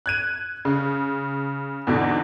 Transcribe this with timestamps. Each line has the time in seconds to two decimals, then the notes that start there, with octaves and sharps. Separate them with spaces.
0.06 F#6 G#6 D#7
0.65 C#3
1.87 E2 G#2 B2 D3